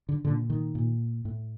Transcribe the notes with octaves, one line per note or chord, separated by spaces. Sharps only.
D3
A#2 D3
D#3
A#2
A2